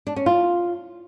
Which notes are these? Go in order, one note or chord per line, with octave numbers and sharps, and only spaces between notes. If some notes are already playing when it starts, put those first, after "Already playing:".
D4
C#4
F4